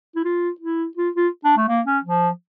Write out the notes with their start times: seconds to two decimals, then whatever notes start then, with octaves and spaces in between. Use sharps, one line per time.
0.16 E4
0.25 F4
0.60 E4
0.97 F4
1.15 F4
1.45 D4
1.57 A3
1.68 A#3
1.86 C#4
2.04 F3